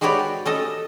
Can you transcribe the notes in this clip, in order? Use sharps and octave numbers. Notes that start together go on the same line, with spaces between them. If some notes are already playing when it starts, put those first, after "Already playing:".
G#3 F#4 G4 B4 C#5 D5
C#4 A4 D#5